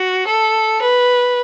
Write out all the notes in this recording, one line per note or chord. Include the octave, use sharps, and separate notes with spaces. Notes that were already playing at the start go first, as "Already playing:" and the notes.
Already playing: F#4
A4
B4